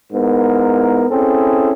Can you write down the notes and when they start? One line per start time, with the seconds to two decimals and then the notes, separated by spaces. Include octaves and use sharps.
0.12 G#2 B3 E4 A#4
1.09 C4 C#4 E4 G#4 A4